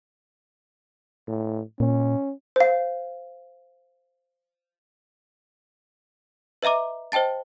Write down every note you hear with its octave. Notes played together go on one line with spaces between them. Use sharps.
A2
A#2 C#4
C5 F5
B4 D#5 E5 A#5 D6
C5 D#5 G5 A5 A6